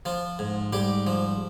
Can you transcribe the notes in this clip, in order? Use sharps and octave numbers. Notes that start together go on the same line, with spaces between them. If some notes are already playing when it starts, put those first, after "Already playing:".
F3 F4
G#2
G#2 G3 G4
F3